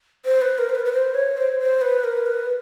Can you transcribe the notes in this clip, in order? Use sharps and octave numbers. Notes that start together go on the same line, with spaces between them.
C5
B4
A#4
C5
B4
B4
C5
C#5
C5
C5
B4
A#4
B4